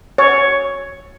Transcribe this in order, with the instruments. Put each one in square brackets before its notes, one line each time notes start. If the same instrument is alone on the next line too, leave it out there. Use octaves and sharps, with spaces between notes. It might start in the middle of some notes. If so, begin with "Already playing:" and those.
[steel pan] C#5